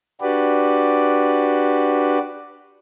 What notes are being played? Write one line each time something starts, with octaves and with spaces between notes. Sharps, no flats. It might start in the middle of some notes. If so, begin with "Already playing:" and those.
D4 F#4 G4 B4 D5